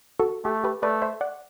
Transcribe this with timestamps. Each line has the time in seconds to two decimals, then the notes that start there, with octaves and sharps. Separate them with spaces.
0.19 F#4 A4
0.44 A3 G4
0.64 G4 B4
0.83 A3 B4 D5
1.02 C5 E5
1.21 D5 F#5